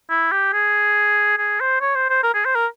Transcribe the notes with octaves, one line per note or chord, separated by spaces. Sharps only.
E4
G4
G#4
G#4
C5
C#5
C5
C5
A#4
G#4
C5
A#4